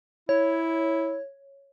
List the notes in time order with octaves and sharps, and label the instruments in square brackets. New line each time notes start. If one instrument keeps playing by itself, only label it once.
[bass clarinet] E4 [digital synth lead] C#5